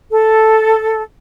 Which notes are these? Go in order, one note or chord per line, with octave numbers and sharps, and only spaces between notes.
A4